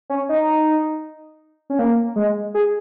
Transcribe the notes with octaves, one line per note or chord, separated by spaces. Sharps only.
C#4
D#4
C#4
A#3
G#3
G#4